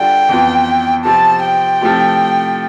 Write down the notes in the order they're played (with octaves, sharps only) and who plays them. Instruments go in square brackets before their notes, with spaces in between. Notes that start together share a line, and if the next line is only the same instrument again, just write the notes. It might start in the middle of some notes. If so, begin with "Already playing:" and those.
Already playing: [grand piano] D3 G3 D4 F4 [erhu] G5
[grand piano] F2 E3 B3 F4
[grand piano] C3 F3 C4 G4 [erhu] A5
[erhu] G5
[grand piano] C3 F3 A3 E4 G4